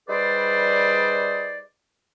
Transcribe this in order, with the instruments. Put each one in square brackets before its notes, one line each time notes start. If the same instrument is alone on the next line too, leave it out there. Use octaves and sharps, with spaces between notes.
[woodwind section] G3 D#4 G#4 B4 C5 D5